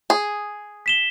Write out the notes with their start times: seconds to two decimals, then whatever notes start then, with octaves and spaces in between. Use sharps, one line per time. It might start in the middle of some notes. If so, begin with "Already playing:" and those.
0.10 G#4
0.86 B6 E7 G7